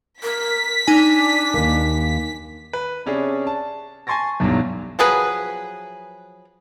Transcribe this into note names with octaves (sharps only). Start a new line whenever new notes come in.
A#4 B6
D4 D#4 G#5
D#2 A#3
B4
C3 C#4 D4 G#4
A5
G#5 A5 C6 C#6 A6 A#6
B1 G2 B2 E3 F#3
F3 F#3 G#4 B4